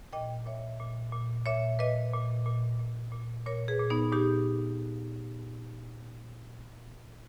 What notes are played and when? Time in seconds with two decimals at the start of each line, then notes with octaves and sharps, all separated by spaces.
0.13 A#2 D#5 G5
0.46 A#2 C#5 E5
0.80 A#2
1.13 A#2
1.46 A#2 C#5 E5
1.79 A#2 B4 D#5
2.13 A#2
2.46 A#2
2.80 A#2
3.12 A#2
3.46 A#2 A#4 C#5
3.68 G#4 B4
3.80 A#2
3.90 B3 D#4
4.12 A#2 D#4 G4